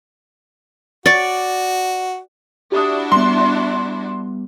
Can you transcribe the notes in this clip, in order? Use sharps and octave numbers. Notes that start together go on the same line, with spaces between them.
F#4 D5 C#6
D4 E4 F#4 G4 D#6
G3 B3 C6